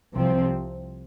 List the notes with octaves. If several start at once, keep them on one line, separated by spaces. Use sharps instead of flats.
C2 C3 F3 C4